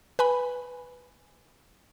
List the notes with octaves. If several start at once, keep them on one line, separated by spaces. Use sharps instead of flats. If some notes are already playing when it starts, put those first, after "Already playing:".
B4 G#5 B5